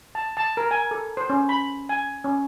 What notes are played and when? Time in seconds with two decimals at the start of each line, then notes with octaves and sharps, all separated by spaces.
0.15 A5
0.37 A5
0.57 A#4
0.71 G#5
0.91 A4
1.17 C5
1.30 C#4
1.49 B5
1.89 G#5
2.24 C#4